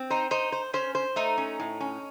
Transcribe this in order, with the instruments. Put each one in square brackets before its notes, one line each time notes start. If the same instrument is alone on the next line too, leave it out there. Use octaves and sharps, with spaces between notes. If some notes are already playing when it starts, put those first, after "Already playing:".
Already playing: [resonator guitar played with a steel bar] C4
[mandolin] D#4 [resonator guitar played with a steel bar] C5
[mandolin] D#4 [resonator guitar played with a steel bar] C5
[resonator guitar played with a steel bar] C5
[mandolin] C#4 [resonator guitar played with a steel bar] C5
[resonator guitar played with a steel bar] C5
[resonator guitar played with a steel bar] A3 [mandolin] D#4
[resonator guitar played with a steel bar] C#4
A2
C#4